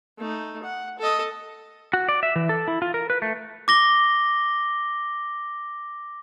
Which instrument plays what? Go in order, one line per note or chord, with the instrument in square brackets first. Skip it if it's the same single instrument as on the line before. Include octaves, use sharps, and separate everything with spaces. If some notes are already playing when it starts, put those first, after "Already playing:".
[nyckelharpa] A3 D#4
F#5
A4 D#5
[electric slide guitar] F#4
D5
E5
E3
A4
E4
F4
A#4
B4
A3
[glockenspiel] D6 A#6 G7